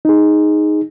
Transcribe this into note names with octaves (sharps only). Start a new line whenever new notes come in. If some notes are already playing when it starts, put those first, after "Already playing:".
D#4 G#4